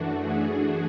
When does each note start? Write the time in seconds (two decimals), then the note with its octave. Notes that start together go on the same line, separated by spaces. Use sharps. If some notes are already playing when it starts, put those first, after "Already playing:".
Already playing: F#2 E3 A3 D4 F#4
0.16 G#4